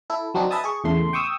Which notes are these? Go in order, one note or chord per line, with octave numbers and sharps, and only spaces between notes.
E4 A4
F#3 C4 D4 D#4
B4 D#5 E5 G#5 A5 D#6
G#4 C#6
E2 A2 C#3 A3 C6
G5 C#6 D#6 E6